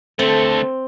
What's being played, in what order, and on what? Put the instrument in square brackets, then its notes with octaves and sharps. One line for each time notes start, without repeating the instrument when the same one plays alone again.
[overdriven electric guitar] D3 A3 [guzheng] C4 [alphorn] A4